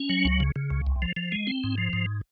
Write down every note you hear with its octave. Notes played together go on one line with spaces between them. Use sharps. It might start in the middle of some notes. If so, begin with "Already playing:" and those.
Already playing: C#4
F#3
C#2
C#3
C#3
C#2
C2
F3
F3
G#3
C4
G#2
F3
G#2